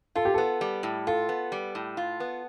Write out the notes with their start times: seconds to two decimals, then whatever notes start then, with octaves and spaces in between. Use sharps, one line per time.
0.15 F4 A4
0.25 G4
0.34 B3 A4
0.61 G3
0.83 A2
1.07 F4 A4
1.29 B3
1.52 G3
1.75 A2
1.97 F4
2.20 B3